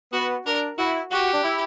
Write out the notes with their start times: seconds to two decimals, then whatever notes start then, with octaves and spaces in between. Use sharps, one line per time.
0.13 B3 F#4
0.46 D4 A#4
0.78 E4 F#4
1.11 F#4 G4
1.34 D4
1.43 E4